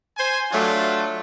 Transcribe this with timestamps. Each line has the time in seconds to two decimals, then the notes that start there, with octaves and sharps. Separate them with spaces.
0.17 C5 G#5
0.52 F#3 A3 D4 F4